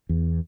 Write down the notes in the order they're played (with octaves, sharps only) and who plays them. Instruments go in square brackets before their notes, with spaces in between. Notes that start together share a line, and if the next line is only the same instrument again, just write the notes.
[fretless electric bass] E2